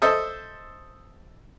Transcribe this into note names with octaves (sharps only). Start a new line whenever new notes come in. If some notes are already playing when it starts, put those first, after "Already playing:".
A4 C5 D#5 E5